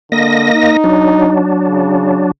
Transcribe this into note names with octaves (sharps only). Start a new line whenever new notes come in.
D3 A#3 D#5 A#6
D#4
F#3 D4
C#3